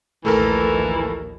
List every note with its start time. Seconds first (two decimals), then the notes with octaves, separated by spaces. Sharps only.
0.25 A#1 D#2 E3 A3 A4 A#4